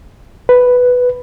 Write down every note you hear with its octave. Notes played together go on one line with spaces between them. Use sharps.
B4